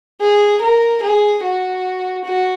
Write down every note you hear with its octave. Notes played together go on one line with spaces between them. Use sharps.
G#4
A#4
G#4
F#4
F#4